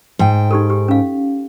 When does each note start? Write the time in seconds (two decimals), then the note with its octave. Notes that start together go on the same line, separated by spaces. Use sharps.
0.19 G#2 G5
0.51 D#4 G4 A4
0.70 G4
0.88 C#4 F5